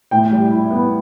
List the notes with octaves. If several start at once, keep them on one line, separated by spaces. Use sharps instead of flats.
A2 G5
G3
E4
B3